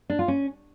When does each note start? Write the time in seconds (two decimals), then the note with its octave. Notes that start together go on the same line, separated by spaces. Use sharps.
0.10 D4
0.19 F4
0.28 C#4